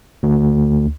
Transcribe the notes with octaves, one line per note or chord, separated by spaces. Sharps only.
D2